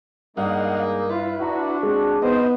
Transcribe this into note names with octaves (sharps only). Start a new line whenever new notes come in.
G2 G#3 A#3 D#4 D#5 F5 F#5
E4 F4 B4
D4 F#4 F#5 A#5
G#3 C4
B3 D#4 C5 D#5